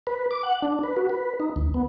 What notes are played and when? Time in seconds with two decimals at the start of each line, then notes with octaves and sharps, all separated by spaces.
0.07 B4
0.31 D6
0.43 F#5
0.62 D4
0.83 B4
0.97 F#4
1.10 B4
1.40 D#4
1.56 D2
1.74 B3